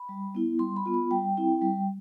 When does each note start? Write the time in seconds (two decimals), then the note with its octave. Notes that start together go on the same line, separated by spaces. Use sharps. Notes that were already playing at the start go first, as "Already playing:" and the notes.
Already playing: B5
0.09 G3
0.35 B3 E4
0.59 G3 C6
0.76 B5
0.86 B3 F4
0.94 B5
1.11 G3 G5
1.37 C4 E4
1.62 G3